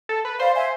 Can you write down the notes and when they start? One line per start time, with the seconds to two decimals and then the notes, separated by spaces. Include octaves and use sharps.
0.09 A4
0.25 B4
0.39 C5 D5 F5
0.55 E5 G#5